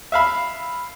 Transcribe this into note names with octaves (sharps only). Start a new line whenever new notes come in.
E5 F5 B5